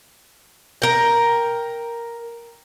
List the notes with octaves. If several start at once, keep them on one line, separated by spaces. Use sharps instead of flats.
A#4 G5